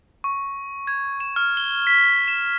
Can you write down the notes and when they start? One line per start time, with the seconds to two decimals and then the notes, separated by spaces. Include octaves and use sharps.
0.24 C#6
0.87 G#6
1.20 E7
1.36 F6
1.57 G7
1.87 B6
2.28 E7